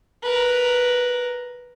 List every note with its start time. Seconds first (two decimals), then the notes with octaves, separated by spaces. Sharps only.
0.23 A#4 B4